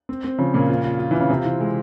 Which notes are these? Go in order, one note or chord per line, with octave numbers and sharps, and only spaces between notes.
C4
C4
C#3 F3
A#2 C#3
F4
F4
F4
E3 F4
C#3
C3 C4
E3
G#3